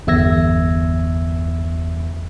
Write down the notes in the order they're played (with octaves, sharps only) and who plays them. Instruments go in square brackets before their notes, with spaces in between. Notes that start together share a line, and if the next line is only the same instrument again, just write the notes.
[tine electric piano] G1 E2 E5 E6 G#6 A#6